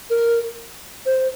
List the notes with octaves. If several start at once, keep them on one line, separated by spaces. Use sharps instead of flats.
A#4
C5